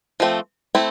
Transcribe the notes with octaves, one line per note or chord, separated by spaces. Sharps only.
F3 A3 C4
A3 C4 E4